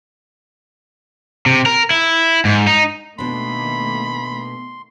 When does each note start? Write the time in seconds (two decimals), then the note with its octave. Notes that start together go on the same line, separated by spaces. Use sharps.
1.46 C3
1.66 A#4
1.91 E4
2.45 G#2
2.67 D#4
3.19 B2 D#3 A3 A#3 D4 B5 C6